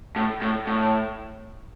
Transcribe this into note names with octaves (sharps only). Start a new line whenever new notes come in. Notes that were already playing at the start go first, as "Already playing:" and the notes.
A2
A2
A2